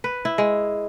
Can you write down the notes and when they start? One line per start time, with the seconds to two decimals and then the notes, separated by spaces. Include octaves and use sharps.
0.04 B4
0.25 E4
0.38 G#3